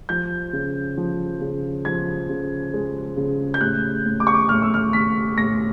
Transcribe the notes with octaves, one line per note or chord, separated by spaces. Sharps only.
F3 G6
C#3
F3
C#3
F3 G#6
C#3
G#3
C#3
G6
A2 F#6
A2
D6
C#6
D6
A2 F6
E6
F6
A2 B6
A2 A#6